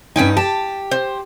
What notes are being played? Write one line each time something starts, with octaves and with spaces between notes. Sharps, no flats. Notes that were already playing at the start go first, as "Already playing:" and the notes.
G2 C#4 D#4 G5 G#5
G4 A5
C5